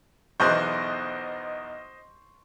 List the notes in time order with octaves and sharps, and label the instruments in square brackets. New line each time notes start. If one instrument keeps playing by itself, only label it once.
[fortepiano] B1 E2 F#6 [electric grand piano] C5 D#5 G6 [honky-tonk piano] C6 C#6